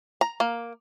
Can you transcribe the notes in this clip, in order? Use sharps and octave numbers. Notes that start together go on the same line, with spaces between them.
A#5
A#3